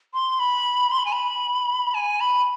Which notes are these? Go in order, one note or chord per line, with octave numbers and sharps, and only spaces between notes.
C6
B5
C6
B5
G#5
B5
G#5
B5